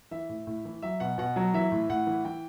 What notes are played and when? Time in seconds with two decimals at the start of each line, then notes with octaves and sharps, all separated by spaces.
0.11 E3 E5
0.29 A2
0.47 A2
0.65 E3
0.82 F#3 E5
1.00 B2 F#5
1.18 B2 F#5
1.36 F#3
1.54 E3 E5
1.72 A2
1.89 A2 F#5
2.07 E3
2.25 E3 G5